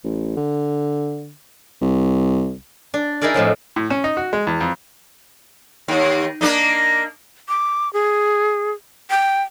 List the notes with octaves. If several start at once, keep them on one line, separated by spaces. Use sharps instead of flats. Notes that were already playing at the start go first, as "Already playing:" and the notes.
A1
D3
C2
D4
D#4 E4 G#4 A#4 D5
F2 A2 F3 F#3
A2
C#4
D#4
F#4
G#3
E2
F2
D#2
A#3 D4 D#4
D6
G#4
G5